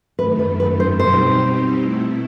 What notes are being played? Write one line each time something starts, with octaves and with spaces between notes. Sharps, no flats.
F#2 D#3 A3 B4
B4
B4
C5
B2 G3 C4 D#4 G4 C5
B2 A3 E4